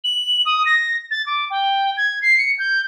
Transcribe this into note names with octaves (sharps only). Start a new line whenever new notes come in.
F#7
D#6
A#6
A6
D6
G5
G#6
C7
C#7
G6